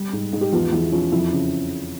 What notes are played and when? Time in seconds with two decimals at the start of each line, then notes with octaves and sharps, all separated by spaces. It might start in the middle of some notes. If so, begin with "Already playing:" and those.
Already playing: G3
0.13 G#2
0.33 G#2
0.41 G4
0.52 E2 F3 F4
0.72 E2 E4
0.92 F3 C#4
1.12 F2 E4
1.32 C#3